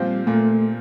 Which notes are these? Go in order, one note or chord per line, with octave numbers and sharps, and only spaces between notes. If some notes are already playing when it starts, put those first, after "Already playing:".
Already playing: A#2 F3 G3 C4 G4 C5
A#2 A3